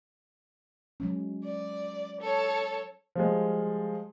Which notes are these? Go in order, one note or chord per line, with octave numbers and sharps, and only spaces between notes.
F#3 G#3 C#4
D5
A4 C#5
F3 G3 G#3